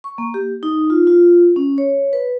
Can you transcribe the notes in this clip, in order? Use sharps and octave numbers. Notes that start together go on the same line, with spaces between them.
C#6
A#3
G4
D#4
F4
F4
C#4
C#5
B4